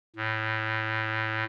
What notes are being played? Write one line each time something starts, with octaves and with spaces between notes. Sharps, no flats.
A2